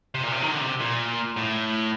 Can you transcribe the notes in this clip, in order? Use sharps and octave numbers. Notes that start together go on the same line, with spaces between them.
C3
A#2
C3
D#3
D3
C3
A#2
A2